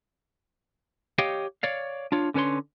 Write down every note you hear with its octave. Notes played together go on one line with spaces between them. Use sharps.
G4 C#5 D#5 F5 G5
C#5 D5 F5
D4 F4 C#5
D3 C#4 B4 C#5 C6